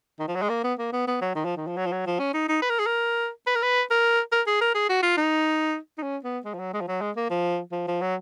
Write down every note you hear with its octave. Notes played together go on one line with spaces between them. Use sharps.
D#3
F3
F#3
G#3
A#3
B3
A#3
B3
B3
F#3
D#3
F3
D#3
F3
F#3
F3
F#3
F3
C#4
D#4
D#4
B4
A#4
G#4
A#4
B4
A#4
B4
A#4
A#4
G#4
A#4
G#4
F#4
F4
D#4
D#4
C#4
B3
G#3
F3
F#3
G#3
F3
F#3
G#3
A#3
F3
F3
F3
F#3